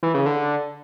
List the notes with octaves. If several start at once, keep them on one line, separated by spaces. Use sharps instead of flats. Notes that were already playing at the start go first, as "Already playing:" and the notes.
E3
C#3
D3